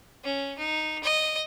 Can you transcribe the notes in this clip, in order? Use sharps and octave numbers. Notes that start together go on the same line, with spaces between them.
C#4
D#4
D#5